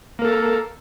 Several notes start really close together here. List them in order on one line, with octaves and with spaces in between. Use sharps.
A#3 A#4 A4